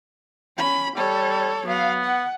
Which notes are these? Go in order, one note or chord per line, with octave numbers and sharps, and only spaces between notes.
C#4 B5
G3 A4 C#5
F#3 B3 F5
F#5